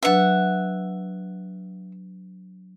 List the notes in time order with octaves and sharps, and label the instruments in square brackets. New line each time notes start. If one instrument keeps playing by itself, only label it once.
[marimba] F#3 D4 B4 [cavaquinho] E5 F#5